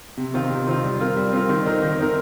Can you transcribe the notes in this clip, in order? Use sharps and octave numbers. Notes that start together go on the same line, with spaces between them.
C3
D#3 C4 F4
C3
D#3 C4 F4
G3
C4 F4 A#4
G3
C4 F4 A#4
D#3
C4 D#4 A#4
D#3
C4 D#4 A#4